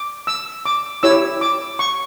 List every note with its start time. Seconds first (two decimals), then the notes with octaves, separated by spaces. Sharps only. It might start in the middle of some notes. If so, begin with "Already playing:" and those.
Already playing: D6
0.27 E6
0.66 D6
1.03 E4 G4 C#5 E6
1.41 D6
1.79 C#6